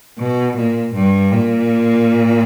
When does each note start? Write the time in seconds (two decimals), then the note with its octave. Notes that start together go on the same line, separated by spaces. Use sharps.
0.18 B2
0.57 A#2
0.95 G2
1.32 A#2